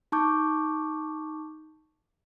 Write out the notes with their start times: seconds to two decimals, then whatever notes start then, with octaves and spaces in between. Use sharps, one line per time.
0.12 D#4 A5 C#6 D6 G6